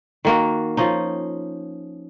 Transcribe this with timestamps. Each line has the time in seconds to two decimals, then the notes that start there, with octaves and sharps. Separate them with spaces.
0.25 D#3 A#3 F#4
0.77 F3 C#4 D#4